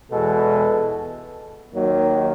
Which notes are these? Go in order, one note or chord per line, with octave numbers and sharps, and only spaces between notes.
E2 B2 G#3 A4
D#2 D#3 F#3 A#3